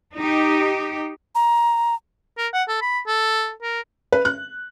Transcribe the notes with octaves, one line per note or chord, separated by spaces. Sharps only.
D#4 G4
A#5
A#4
F#5
A4
B5
A4
A#4
B4
F#6